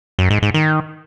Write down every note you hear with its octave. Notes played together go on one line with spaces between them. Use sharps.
F#2
G#2
G#2
D#3